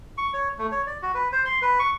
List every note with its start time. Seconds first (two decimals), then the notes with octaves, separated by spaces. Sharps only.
0.18 C#6
0.34 C#5
0.58 A3
0.72 C#5
0.87 D5
1.02 F#4
1.15 B4
1.32 C5
1.45 C6
1.62 B4
1.79 C#6